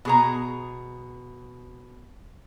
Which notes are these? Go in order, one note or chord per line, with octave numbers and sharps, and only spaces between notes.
B2 G#4 A#5